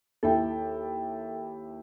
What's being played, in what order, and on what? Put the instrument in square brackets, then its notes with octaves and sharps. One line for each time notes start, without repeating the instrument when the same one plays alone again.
[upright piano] D#2 E4 G5 [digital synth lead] A4